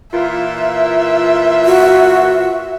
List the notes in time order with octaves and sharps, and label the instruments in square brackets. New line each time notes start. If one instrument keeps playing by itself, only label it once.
[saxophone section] A#2 E3 F4 [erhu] E5
[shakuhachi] F#4